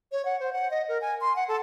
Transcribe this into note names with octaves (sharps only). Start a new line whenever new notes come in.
C#5
F#5
C5
F#5
D#5
A#4
G#5
C6
F#5
A4